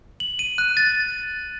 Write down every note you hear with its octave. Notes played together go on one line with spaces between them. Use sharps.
F#7
D#7
F#6
A6